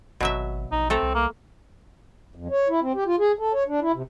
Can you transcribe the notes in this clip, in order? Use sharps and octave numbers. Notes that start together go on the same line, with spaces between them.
G#1 B2 F#3 E5
A#1 D#4
A3 C4 A4 A#5
C2
A#3
F2
C#5
E4
C4
G4
F4
G#4
A4
C#5
D4
E4
C3